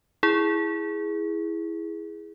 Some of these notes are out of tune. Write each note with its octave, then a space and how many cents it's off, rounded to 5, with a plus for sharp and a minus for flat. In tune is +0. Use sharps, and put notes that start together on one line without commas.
E4 +0 G#4 +0